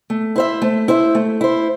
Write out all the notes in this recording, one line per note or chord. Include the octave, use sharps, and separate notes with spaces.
A3
E4 C5 E5
A3
E4 C5 E5
A3
E4 C5